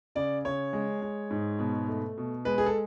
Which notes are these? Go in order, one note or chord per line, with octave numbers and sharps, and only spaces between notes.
C#3 D5
C#3 C#5
G#3
G#3
G#2
B2
A3
B2
G#3 B4
G#4
A4